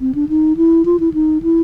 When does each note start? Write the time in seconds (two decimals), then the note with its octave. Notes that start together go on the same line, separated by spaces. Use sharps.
0.01 C4
0.15 D4
0.29 D#4
0.57 E4
0.85 F4
1.00 E4
1.14 D#4
1.42 E4